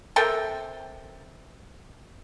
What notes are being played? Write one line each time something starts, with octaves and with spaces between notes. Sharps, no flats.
C3 A4 A#4 G5